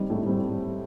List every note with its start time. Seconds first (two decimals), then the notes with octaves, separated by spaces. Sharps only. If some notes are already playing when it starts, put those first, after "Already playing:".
Already playing: G3 C4 D#4
0.10 A2
0.26 G3 C4